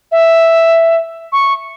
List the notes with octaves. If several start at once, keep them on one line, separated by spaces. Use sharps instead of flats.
E5
C#6